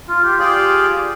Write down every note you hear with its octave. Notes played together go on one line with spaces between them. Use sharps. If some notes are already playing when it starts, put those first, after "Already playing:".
F4
F4 G4
F4 G4 G#4 D5